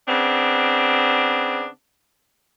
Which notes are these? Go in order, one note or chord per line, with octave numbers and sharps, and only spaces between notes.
C#3 B3 C4 D4